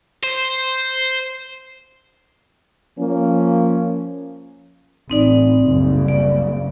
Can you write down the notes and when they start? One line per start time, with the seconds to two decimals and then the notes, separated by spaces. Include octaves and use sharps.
0.24 C5
2.99 F3 A#3 C#4
5.10 A1 C4 D#4 D5
5.67 F#1 C2 C#3
6.08 D5